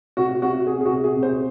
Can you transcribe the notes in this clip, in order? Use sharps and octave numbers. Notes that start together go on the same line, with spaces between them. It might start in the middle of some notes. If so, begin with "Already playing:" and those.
C3 F#4
C3 F#4
C3 G#4
G#4
F#4
C3
G#4
C3
G#4 C5